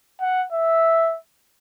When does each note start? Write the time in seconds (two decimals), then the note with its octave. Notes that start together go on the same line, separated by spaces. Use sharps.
0.21 F#5
0.52 E5